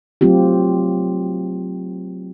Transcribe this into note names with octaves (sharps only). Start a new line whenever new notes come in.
F#3 A3 C4 F4 G4